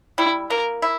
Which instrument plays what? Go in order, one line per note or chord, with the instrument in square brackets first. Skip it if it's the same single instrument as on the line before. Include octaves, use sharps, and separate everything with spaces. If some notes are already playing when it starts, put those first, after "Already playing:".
[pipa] G3 [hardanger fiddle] E4
[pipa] A#3 [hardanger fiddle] A#4
[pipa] E4